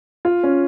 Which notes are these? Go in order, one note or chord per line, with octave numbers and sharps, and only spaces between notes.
F4
C#4